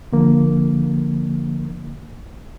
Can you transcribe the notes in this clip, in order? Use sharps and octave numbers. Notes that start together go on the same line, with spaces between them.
D3 F3 A#3